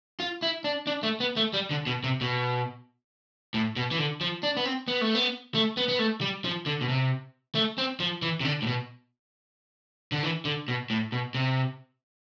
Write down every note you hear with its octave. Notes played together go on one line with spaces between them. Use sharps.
F4
E4
D4
D4
A3
B3
A3
G3
D3
B2
C3
B2
A2
B2
E3
D3
F3
D4
B3
C4
B3
A3
B3
A3
B3
B3
A3
G3
F3
D3
B2
C3
A3
C4
F3
E3
C3
D3
A2
B2
D3
E3
D3
B2
A2
B2
C3